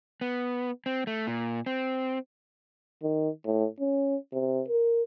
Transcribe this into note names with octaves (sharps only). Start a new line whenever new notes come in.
B3
C4
A3
A#2
C4
D#3
A2
C#4
C3
A#4